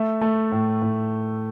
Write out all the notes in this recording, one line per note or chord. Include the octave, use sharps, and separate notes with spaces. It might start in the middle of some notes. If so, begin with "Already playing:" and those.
Already playing: A3 E5
A3
A2
A2